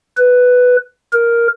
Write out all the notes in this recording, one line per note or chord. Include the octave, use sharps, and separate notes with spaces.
B4
A#4